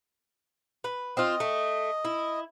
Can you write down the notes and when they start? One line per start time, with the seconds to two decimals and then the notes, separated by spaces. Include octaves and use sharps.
0.84 B4
1.17 C4 F4 D#5
1.40 A3
2.05 E4